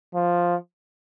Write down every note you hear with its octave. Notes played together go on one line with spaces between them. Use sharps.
F3